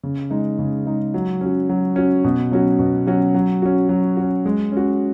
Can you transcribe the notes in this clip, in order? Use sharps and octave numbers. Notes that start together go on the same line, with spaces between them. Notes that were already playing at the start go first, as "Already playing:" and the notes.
C#3
G#3 D#4
C#3
G#3 D#4
F#3
C#4 F#4
F#3
C#4 F#4
B2
F#3 C#4 F#4
B2
F#3 C#4 F#4
F#3
C#4 F#4
F#3
C#4 F#4
G#3
C#4 F#4